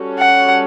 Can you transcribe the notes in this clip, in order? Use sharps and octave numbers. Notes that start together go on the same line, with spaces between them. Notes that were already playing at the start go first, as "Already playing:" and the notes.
Already playing: G3 C#4 F#4 A4 C#5
F#5